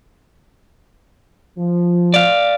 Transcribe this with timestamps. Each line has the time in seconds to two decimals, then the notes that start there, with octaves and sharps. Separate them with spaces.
1.58 F3
2.14 D5 F5